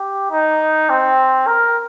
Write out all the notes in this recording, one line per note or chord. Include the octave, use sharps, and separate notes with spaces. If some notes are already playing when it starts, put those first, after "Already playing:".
Already playing: G4
D#4
C4
A#4